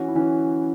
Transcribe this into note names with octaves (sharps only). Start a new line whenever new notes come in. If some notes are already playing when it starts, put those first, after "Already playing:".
Already playing: E3 C#4 F#4
E4
E3 C#4